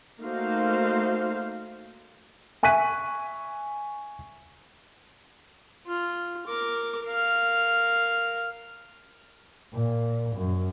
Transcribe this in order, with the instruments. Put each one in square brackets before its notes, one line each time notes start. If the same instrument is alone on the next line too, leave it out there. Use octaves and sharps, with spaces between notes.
[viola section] A3 A#3 D#4 F#4 C5 F5
[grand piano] E5 G#5 C#6 F#6 B6 D#7
[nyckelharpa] F4
A#4 D6
A#4 F5
[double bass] A#2
F#2